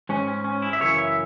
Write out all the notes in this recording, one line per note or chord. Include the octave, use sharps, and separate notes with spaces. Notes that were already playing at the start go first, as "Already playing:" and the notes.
G#2 G#3 C#4
C#4
C#4
E4
E5
F#2 C#3 E3 C#5
E5